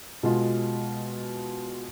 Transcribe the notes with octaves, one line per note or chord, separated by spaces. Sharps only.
B2 G#3 F4